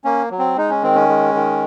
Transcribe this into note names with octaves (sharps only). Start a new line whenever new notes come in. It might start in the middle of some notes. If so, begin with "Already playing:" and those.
A#3 C#4
F#3
C4
G#3 D#4
C#4
D#3 C4
C#4
G#3
D#3